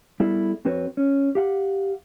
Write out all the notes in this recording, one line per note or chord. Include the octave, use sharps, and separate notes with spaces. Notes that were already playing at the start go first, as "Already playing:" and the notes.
G3 B3 E4 G#4 A4
F2 C4 F#4 B4 C#5
C#4
G4 F5 F#5